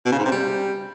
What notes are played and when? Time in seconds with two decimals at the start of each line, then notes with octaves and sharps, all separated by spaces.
0.05 B2
0.12 C#3
0.19 G#2
0.25 C3
0.32 G3